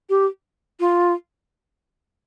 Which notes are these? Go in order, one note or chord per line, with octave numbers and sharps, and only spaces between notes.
G4
F4